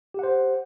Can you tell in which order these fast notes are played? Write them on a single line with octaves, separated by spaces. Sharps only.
G4 F#5 C5